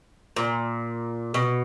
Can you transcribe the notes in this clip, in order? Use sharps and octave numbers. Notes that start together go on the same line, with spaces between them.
A#2
B2